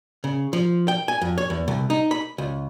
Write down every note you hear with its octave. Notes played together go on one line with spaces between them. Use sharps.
C#3
F3
G5
G#5
F2
C#5
E2
C2
D#4
B5
C#2